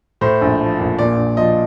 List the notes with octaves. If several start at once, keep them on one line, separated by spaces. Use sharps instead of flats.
A2 C5
A#1
F3
A#1
A#2 D5
A#1
F3 D#5